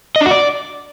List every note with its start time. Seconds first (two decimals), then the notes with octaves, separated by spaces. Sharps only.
0.16 D#5
0.21 D4
0.26 F#4
0.31 D5